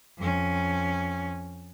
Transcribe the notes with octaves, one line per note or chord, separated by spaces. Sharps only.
F2 C#4